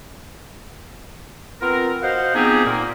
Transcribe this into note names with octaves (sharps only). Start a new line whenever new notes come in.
B3 C4 F4 A#4
F#4 C5 D#5 F5 F#5
F3 B3 C4 D#4 G4 G#4
A#2 A#3